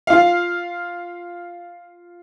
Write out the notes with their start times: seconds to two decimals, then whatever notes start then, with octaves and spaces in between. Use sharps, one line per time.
0.07 F4 F5